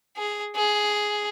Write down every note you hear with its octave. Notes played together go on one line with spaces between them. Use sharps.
G#4
G#4